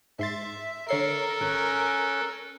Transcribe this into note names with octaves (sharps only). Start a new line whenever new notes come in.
G#2 E5 C6 A6
D3 A4 A#4 C#5 C7
G#1 C#4 G#5 F#6